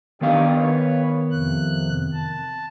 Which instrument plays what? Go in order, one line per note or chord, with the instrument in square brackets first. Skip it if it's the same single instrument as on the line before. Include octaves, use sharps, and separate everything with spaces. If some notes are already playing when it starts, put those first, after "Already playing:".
[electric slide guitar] D#3 B3 F5 [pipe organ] D4 D#4 G4
[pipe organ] B4 C#5
F2 C3 F#6
A5